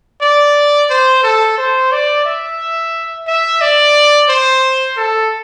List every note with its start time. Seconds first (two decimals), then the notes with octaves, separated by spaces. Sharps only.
0.21 D5
0.90 C5
1.23 A4
1.58 C5
1.92 D5
2.25 E5
3.27 E5
3.61 D5
4.29 C5
4.97 A4